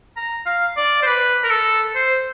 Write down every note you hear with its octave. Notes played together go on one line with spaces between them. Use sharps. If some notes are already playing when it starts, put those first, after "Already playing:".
A#5
F5
D5
C5
B4
A#4
A4
C5